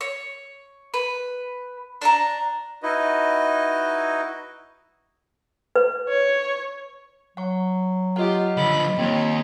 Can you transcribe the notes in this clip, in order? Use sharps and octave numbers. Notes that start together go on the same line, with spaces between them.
C#5
B4
D4 A5 A#5
D#4 E4 F#4 B4 D#5
B4
C#5
F#3 F#5 C#6
F4 G4 D#5 F#5
D3 F3 D#5 B5
D#2 C4 C#5